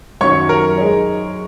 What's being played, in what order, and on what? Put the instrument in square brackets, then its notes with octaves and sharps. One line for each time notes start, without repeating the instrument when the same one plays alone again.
[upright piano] F#2 D#3 F#3 C#4 [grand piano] C#5 C#6
[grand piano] A#4 A#5
[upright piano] G#3 D#4 G#4 C#5